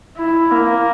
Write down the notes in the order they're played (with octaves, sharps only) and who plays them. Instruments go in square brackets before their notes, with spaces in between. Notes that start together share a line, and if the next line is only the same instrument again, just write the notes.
[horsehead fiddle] E4
A#3